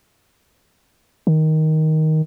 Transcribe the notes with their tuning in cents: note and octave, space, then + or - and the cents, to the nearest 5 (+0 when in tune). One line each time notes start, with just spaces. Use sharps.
D#3 +10